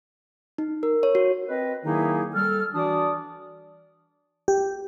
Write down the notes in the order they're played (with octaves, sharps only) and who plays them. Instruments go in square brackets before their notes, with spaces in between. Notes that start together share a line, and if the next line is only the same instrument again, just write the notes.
[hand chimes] D#4
A#4
C#5
F#4
[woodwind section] C4 B4 D#5
D#3 F#3 A#3 D#4 E4 G#4
G3 A4 F6
E3 D4 F#4 D5 D#6
[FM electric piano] G4